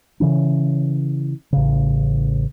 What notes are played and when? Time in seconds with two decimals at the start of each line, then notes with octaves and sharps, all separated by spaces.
0.20 C#3 E3 C#4
1.52 A1 C#3